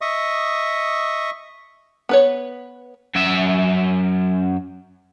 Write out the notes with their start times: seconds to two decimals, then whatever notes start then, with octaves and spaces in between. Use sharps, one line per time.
0.01 D#5 E5 C#6 D#6
2.09 B3 B4 C#5
3.15 F#2 E5